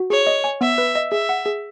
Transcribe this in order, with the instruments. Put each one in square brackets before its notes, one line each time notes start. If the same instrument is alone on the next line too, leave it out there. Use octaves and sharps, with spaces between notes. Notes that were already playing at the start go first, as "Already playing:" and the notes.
Already playing: [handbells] F#4
[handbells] G#4 [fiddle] C#5
[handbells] D#5
G#5
[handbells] B3 [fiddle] E5
[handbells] B4
D#5
[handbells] G#4 [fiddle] E5
[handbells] F#5
G#4